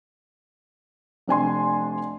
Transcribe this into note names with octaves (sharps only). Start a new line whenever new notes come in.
F1 D4 G#5 C6